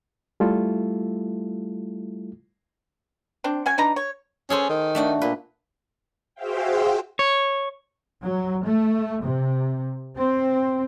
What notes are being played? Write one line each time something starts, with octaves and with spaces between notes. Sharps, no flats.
G3 A3 E4 F4 A4
C4 D4
F#3 C#4 G#5
D4 D#4 B4 A#5
C#5
C#4 G#4 A4 C5
D#3
A3 D4 F#4
A#2 B4
F#4 G#4 C5 E5 F5 G5
C#5
F#3
A3
C3
C4